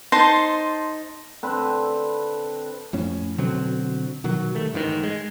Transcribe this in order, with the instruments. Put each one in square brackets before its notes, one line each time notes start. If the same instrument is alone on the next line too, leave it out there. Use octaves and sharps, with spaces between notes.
[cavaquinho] D#4 C5 A5 C6
[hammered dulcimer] D3 C4 B4
[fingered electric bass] F2 A2 C#4
B2 D3 F#3 C4
B2 D#3 F#3
D#3 G3 A3
A1 G#2 C3 D#3
G#3